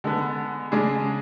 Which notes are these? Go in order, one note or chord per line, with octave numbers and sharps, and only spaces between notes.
D3 G#3 B3
C#3 G#3 D4 G#4